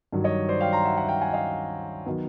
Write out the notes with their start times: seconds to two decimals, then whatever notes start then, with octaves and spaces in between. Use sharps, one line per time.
0.12 G2 D#3 F#3
0.24 C#5 D#5
0.49 C5 D5
0.61 F5 G5
0.73 A#5 C6
0.85 E5 F#5
0.97 E5 F#5
1.08 F5 G5
1.21 F#5 G#5
1.33 D#5 F5
2.06 D#3 F#3 B3